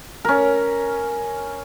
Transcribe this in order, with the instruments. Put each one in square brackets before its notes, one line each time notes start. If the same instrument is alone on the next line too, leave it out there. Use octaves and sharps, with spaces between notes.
[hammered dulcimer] C#4 A#4